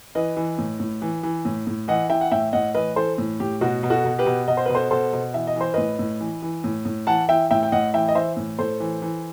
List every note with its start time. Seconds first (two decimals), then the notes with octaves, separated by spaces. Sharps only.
0.15 E3 B4 D#5
0.37 E3
0.58 A2
0.80 A2
1.02 E3
1.23 E3
1.45 A2
1.67 A2
1.88 E3 D#5 F#5
2.10 E3 E5 G5
2.21 F#5
2.31 A2 E5 G5
2.53 A2 D#5 F#5
2.75 E3 B4 D#5
2.96 E3 A4 C5
3.18 A2
3.40 A2 G4
3.61 B2 F#4
3.83 B2
3.90 F#4 A4
4.05 B2
4.19 G4 B4
4.26 B2
4.48 B2 D#5
4.57 C5
4.66 B2 B4
4.74 A4 C5
4.91 B2 A4 C5
5.13 B2
5.34 E3 E5
5.47 D#5
5.56 E3 C5
5.74 A2 B4 D#5
5.99 A2
6.21 E3
6.42 E3
6.64 A2
6.85 A2
7.07 E3 F#5 A5
7.29 E3 E5 G5
7.51 A2 E5 G5
7.63 G5
7.72 A2 D#5 F#5
7.94 E3 E5 G5
8.09 D#5
8.15 E3 C5 E5
8.37 A2
8.59 A2 A4 C5
8.80 E3
9.02 E3